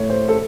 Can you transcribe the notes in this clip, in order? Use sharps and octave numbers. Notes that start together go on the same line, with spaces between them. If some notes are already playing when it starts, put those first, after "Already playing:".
Already playing: A2 C#5
C5
A4